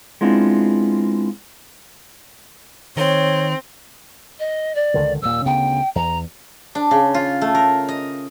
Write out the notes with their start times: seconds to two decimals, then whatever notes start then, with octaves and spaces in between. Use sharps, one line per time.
0.21 G#3 B3 C4 D4 E4 F4
2.97 D#3 C4 C#5
4.39 D#5
4.75 D5
4.94 C#2 D3 D#3
5.22 D#1 A#2 E6
5.46 D2 C#3 B3 G5
5.95 E2 A#5
6.75 D4
6.91 C#3
7.14 F4
7.41 A3
7.55 A#4
7.88 D#5